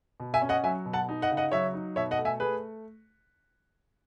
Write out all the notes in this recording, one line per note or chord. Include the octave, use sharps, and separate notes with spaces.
B2
E5 G#5
C#4
D#5 F#5
F#3 E5 G#5
B2
F#5 A5
D#4
D#5 F#5
C#3
D#5 F#5
F#3 C#5 E5
D#4
B2 C#5 E5
D#5 F#5
A3
E5 G#5
A3 G#4 B4